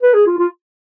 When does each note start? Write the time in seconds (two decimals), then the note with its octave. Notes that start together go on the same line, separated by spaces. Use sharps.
0.02 B4
0.14 G#4
0.26 F4
0.38 F4